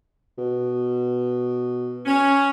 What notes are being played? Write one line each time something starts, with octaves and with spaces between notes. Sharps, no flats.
B2
C#4